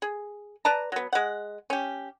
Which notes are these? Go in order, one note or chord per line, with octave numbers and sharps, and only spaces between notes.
G#4
B4 D5 A5 A#5
F#3 B3
G#3 F#5
C#4 G4